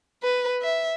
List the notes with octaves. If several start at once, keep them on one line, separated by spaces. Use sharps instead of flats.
B4
E5